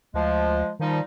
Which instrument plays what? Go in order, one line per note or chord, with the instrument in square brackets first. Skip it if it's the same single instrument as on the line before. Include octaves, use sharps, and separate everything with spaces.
[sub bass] D2 [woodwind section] F3 G#3
[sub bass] D#3 [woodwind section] F3 G3 D#4